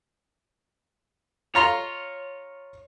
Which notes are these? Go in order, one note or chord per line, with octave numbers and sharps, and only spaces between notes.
F4 C#5 A#5 C6